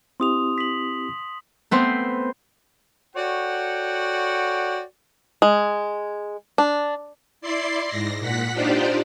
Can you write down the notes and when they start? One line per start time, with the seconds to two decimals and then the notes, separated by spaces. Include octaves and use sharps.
0.20 C4 E4 G4 C6 D#6 F7
0.58 B6 F#7
1.71 A3 B3 C4 C5
3.16 F#4 A4 C#5 D5 F#5 G5
5.42 G#3
6.58 D4
7.41 E4 D5 C6 C7
7.88 G#2 A#6
8.19 A#2 F#5 B6
8.53 D4 D#4 F4 G4 C5 D5